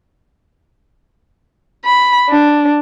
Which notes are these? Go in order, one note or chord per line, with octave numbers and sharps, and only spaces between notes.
B5
D4